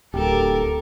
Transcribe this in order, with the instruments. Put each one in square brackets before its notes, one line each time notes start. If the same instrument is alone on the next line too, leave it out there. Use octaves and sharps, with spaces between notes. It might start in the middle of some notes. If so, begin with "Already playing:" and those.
[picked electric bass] D1 [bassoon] G4 [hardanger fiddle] A4 A#4